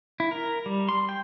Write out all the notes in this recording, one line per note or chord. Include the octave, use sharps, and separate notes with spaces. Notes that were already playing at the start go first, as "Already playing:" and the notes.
E4
A#4
G3
C6
G5